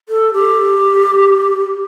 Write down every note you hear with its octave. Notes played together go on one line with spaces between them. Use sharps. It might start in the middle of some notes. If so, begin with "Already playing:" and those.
A4
G4